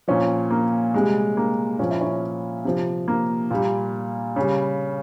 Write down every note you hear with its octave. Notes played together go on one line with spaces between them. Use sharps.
A#2 F3 C#4
A#3
C3 G3 G#3
A#3
A#2 F3 C#4
E4
C#4
C3 F3
A#3
A#2 G3
C#3 G3